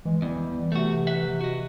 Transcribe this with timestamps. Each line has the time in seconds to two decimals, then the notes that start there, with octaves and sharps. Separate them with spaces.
0.05 E3 G#3
0.22 E2 G3
0.72 C3 A3 F#4
1.07 B4 E5 F#5
1.41 F#4 D#5